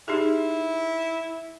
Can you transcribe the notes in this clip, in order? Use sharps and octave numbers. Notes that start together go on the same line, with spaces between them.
D#4 E4 G4 G#4